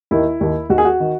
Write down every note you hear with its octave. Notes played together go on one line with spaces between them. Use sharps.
D#2 D#3 E4
D#2 D#3
D#2 D#3 F#4
G#4
F#4
D#3